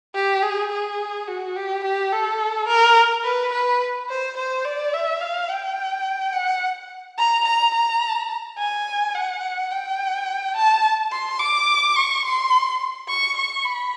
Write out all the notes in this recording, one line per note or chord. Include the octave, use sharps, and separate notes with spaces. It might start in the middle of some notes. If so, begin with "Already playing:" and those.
G4
G#4
G#4
F#4
G4
G4
A4
A#4
B4
B4
C5
C5
D5
E5
F5
G5
F#5
A#5
A#5
A#5
G#5
F#5
G5
A5
C6
D6
C#6
C6
C#6
C#6
B5